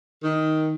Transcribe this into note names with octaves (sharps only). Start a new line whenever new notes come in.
D#3